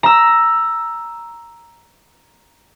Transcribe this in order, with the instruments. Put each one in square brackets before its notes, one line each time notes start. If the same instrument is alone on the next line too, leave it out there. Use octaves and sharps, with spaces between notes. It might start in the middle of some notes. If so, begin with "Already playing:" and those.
[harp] A#5 E6